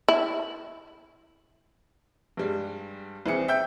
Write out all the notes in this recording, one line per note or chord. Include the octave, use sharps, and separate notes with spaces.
E4
G2 G3 G#3
C2 E3 C4 G#4 C#7
E5 G5 G6